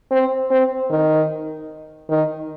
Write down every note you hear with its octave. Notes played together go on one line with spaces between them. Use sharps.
C4
C4
D#3
D#3